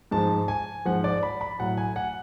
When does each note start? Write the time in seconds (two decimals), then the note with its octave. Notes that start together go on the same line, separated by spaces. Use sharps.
0.11 G#2 F3 A5
0.48 G#5
0.85 G#2 F3 F#5
1.04 D5
1.23 B5
1.41 B5
1.59 A2 F#3 F#5
1.77 G#5
1.96 F#5